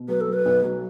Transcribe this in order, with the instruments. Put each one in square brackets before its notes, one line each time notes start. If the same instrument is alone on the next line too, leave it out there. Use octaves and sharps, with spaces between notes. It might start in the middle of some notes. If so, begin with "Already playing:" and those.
Already playing: [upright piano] B2
[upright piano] F#3 [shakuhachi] B4
[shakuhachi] A4
[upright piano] F#3
[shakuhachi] B4
[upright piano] B1
F#3